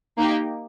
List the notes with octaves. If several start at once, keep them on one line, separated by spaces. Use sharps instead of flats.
A#3 D#4 G4